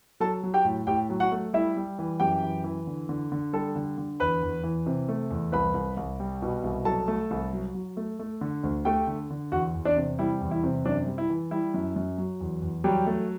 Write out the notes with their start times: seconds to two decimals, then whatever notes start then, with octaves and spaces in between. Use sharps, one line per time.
0.20 F#3 A4 A5
0.43 F#3
0.54 G4 G5
0.65 A2
0.87 A2 G4 G5
1.10 F#3
1.20 F#4 F#5
1.32 A3
1.53 G3 E4 E5
1.76 G3
1.99 E3
2.20 F#2 G4 G5
2.43 E3
2.64 E3
2.87 D3
3.09 D3
3.32 D3
3.53 G3 A4 A5
3.76 D3
3.98 D3
4.20 E2 B4 B5
4.43 E2
4.64 E3
4.86 C3
5.09 A3
5.30 E2
5.52 C2 B4 B5
5.74 C2
5.97 C2
6.20 G3
6.42 B2
6.64 C2
6.85 F#3 A4 A5
7.08 A3
7.31 C2
7.53 F#3
7.74 F#3
7.97 A3
8.19 A3
8.41 D3
8.63 D2
8.85 A3 G4 G5
9.07 D3
9.30 D3
9.52 E2 F#4 F#5
9.75 E2
9.85 D4 D5
9.96 C3
10.19 G3 E4
10.41 E2
10.51 E4
10.64 C3
10.85 F#2 D4
11.07 G3
11.18 E4
11.30 E3
11.51 G3 E4
11.74 F#2
11.96 F#2
12.18 F#3
12.40 E2
12.62 E2
12.84 F#3 G3 G4
13.07 A3